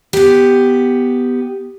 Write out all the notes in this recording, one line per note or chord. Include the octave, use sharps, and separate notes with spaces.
B3 G4